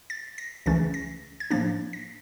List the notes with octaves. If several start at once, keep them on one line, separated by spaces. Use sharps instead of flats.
A6
A#6
C#2 C#3 E3 A3 C#4 A6
A#6
G#6
A2 F3 A#3 D4 A6
A#6